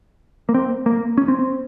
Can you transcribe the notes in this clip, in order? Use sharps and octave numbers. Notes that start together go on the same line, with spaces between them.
A#3
C4
A#3
C#4
C4
C4